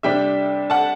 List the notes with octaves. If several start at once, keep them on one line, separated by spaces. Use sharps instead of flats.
C3 G3 D4 E5 G5
F#5 A5